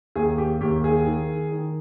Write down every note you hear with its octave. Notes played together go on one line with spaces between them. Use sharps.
D#2 G#4
G4
D#2 G4
G#4
D#3
D#3